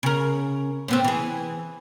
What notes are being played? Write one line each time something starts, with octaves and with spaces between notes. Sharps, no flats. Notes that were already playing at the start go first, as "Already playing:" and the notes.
C#3 A#4
A2 B3 C4
E3 G#4